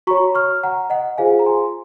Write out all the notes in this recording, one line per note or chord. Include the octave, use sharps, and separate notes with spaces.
F#4 C#5 A#5 C#6
C#6 F6
F#5 A#5
D#5 F#5
F4 G#4 C5 F5 G#5
A#5
G#5 C6